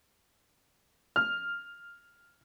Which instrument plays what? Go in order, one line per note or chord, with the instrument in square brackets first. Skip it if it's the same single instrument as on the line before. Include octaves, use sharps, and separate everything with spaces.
[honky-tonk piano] F6